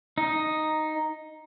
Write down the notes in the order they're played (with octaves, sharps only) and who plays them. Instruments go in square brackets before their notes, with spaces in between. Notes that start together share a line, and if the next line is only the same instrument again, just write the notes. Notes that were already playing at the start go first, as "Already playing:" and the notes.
[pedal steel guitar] D#4